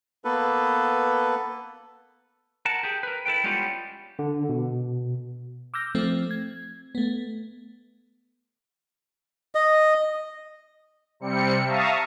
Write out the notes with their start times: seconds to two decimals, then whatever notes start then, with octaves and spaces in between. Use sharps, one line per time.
0.25 A#3 B3 A4 B4
2.65 A#4 F#5 A5
2.83 G4 G#4
3.03 A#4 B4
3.26 E4 A4 B4 G5
3.43 G3 G#3 B3 C#4 F4 G4
4.19 D3
4.49 B2
5.74 D6 E6 F6 G6 A#6
5.95 F3 A3 C4
6.31 G#6
6.95 A3 B3
9.55 D#5
11.20 C3 G3 C4 C#7
11.65 E5 F5 A5 A#5 C#6 D#6